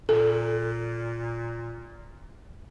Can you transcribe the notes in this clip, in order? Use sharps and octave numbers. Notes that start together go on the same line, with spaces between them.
A#2 A4